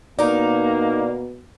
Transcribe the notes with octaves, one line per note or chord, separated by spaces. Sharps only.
B2 A#3 D#4 A#4 D5